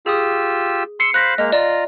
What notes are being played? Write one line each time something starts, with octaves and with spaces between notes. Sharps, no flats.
F4 G4 G#4 D#6 E6
C6 E6 C7 C#7
C5 F5 B5 F#6 A#6 B6
G#3 A#3 D#5 F6
F4 D5 A#5